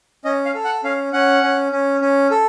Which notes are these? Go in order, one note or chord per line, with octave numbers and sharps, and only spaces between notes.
C#4 D#5
F5
A4
F#5
C#4 F5
C#4 F#5
C#4
C#4
C#4
A4